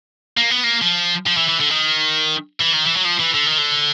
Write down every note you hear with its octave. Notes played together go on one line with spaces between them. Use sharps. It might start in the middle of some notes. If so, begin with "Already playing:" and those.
A#3
B3
A#3
F3
F3
E3
E3
D3
D#3
E3
D#3
E3
F#3
F3
E3
D3
D#3
D3